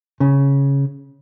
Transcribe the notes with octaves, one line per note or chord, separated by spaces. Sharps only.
C#3